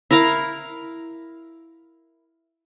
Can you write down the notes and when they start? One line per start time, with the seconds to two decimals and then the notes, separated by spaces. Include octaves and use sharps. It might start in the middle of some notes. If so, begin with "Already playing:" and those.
0.11 E4 A#4 F5 A#5